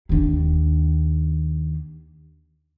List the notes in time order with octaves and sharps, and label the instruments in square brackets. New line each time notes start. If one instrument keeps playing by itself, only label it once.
[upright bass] D#2 D4